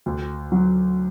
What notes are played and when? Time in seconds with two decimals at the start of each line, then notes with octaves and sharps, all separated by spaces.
0.06 D2
0.52 F#3